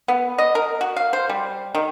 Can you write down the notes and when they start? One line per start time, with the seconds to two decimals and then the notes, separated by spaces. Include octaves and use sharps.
0.08 B3
0.38 D#5
0.55 A#4
0.81 F#4
0.96 F5
1.13 C5
1.29 G3
1.75 D#3